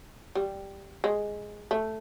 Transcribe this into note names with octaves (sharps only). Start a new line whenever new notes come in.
G3
G#3
A3